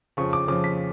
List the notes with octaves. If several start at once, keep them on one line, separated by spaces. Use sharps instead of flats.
F2 C#3 F3 C#6
D6
F2 C#3 F3 D6
B6